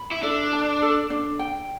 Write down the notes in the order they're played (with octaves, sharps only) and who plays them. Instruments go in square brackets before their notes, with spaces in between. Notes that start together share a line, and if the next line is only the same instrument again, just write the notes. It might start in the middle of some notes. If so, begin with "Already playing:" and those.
Already playing: [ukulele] B5
[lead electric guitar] E4
[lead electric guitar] D4 [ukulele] A4
[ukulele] A5
A4
D4
G5